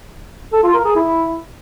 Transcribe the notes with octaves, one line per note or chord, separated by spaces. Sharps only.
A4
F4
A#4
G#4
E4